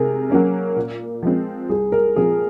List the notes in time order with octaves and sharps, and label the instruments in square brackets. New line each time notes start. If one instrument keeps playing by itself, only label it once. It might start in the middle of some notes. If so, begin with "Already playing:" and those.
Already playing: [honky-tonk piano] C3 [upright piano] G#4 A#4
[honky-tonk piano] F#3 A#3 C#4
A#2
F3 G#3 C4
[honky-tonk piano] C2 [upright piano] G#4
[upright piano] A#4
[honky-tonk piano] A#2 F3 C4 [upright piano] G#4